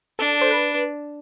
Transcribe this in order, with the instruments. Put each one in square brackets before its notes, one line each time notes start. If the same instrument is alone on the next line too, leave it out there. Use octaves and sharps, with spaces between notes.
[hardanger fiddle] D4 [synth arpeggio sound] A4
[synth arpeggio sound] C5
B4